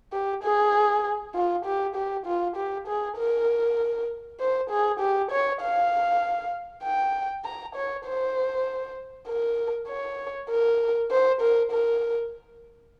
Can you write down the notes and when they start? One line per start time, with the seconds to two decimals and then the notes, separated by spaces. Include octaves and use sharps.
0.13 G4
0.43 G#4
1.35 F4
1.65 G4
1.96 G4
2.26 F4
2.56 G4
2.87 G#4
3.18 A#4
4.40 C5
4.70 G#4
5.00 G4
5.31 C#5
5.62 F5
6.83 G5
7.45 A#5
7.75 C#5
8.06 C5
9.28 A#4
9.89 C#5
10.50 A#4
11.11 C5
11.41 A#4
11.71 A#4